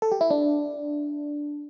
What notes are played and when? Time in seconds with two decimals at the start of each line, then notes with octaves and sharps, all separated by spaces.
0.02 A4
0.12 G4
0.21 E4
0.30 D4